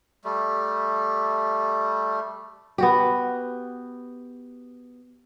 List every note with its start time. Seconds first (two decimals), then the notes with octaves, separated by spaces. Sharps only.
0.24 G3 A3
2.78 B3 F#4 G4